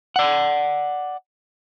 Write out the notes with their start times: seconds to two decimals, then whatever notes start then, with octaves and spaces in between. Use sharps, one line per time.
0.16 D5 F#5